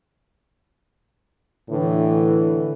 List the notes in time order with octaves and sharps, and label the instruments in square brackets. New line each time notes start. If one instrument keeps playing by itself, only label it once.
[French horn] A2 [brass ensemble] D3 E3